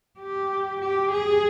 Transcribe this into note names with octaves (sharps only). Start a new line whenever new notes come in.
G4
G4
G#4